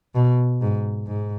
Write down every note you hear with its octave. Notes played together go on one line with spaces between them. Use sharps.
B2
G#2
G#2